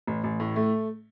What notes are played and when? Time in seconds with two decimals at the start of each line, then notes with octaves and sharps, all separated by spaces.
0.07 A1
0.24 A1
0.40 A2
0.56 A3